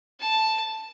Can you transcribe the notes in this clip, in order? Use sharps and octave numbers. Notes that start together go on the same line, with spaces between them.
A5